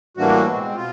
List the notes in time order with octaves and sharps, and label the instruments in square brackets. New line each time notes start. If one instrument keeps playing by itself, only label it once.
[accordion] A2 E3 G3 A#3 D4 F#4
B2 G#3 C4
B2 F4